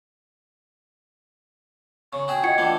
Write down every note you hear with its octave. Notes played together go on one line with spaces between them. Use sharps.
C#3 C#6
F#4 G#4 E5 G5
F4 D#5 F#5 G#6 C#7
E3 A3 D4